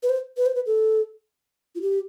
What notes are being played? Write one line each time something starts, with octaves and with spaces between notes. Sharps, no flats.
B4
C5
B4
C5
B4
A4
F4
G4